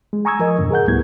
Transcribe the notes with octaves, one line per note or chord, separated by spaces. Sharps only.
G#3
G#5 A#5 C#6 D#6 E6 G#6
F3 A#4 D#5
F2 G#2 B2 D3
G#4 A#4 F#5 G6
D2 A2 G3 B3 E4 G#6